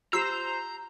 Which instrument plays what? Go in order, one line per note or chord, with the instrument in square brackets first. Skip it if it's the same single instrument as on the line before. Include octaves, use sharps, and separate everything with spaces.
[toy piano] F4 G4 [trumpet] C5 [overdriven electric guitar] A#5 [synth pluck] E6 C7 E7